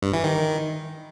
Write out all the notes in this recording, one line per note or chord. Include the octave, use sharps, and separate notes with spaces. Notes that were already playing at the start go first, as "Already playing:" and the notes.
G2
E3
D#3